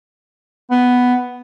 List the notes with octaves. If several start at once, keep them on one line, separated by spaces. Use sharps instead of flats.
B3